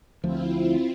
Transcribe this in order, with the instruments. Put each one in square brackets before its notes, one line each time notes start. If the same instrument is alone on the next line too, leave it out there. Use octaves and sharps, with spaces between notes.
[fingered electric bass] D2 F3 A3 [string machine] C4 E4 F4